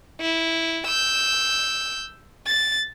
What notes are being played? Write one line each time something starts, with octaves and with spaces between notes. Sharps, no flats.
E4
E6 G6
A6